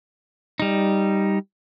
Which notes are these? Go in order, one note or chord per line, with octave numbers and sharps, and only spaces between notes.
G3 D#4